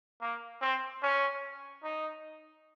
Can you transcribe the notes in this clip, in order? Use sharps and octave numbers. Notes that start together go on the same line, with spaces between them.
A#3
C4
C#4
D#4